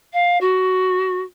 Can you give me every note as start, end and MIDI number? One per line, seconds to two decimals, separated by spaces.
0.13 0.37 77
0.40 1.21 66